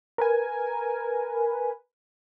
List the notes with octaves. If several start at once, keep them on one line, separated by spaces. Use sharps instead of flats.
A#4 B4 G#5